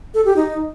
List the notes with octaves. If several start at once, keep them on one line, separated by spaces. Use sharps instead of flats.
A4
G4
D#4